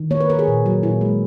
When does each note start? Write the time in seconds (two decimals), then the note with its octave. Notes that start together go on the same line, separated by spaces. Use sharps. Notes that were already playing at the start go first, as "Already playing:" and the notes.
Already playing: D#3
0.11 A#3 C#5
0.20 B4
0.29 A#3 A#4
0.39 G#4
0.48 A#2
0.66 F#3
0.83 A#2 E4
1.01 G#3